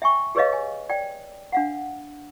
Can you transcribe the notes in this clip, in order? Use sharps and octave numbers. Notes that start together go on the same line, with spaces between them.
E5 G5 G#5 C#6
G4 G#4 B4 C#5 D#5 F5
G#5
D5 G5
D4 F5 F#5